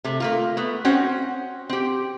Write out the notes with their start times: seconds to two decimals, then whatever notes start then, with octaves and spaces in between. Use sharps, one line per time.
0.04 C3 A3
0.20 A3 A#3 F4
0.57 A3 B3
0.85 C4 C#4 F#4 C5 F#5
1.69 C4 G4